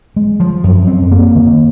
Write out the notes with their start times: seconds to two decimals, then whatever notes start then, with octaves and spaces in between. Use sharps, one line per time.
0.16 G#3
0.40 F3
0.64 F#2
0.87 C4
1.12 A#3
1.35 D#3